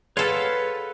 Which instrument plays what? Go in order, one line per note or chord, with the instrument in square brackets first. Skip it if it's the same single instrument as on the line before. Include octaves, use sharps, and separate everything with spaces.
[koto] F4 A4 [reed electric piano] G#4 [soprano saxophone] B4 [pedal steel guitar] C#5 F#5 F6